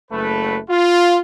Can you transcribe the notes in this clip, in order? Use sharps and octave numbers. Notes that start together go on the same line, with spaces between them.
F#1 A3 B4
F4